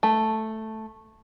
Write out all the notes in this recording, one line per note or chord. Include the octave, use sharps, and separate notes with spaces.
A3